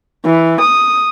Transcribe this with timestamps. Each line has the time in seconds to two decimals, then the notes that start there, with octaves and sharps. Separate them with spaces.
0.25 E3
0.61 D#6